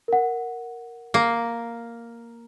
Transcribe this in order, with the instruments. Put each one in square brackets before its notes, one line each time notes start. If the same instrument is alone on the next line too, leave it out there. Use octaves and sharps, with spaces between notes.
[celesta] A#4 F#5
[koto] A#3